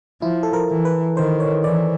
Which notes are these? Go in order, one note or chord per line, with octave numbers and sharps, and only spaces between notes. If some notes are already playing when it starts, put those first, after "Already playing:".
F3 E4
A4
A#4
E3
B4
D#3 C5
C#5
E3 D5